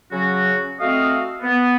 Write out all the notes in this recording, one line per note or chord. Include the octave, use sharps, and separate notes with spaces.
C#3 F#3 C#4 F#4
A3 C4 F#4 D#5 F5
B3